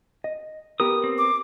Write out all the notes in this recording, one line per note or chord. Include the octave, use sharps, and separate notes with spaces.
D#5
B3 G4 A#4 D#6
C4
D6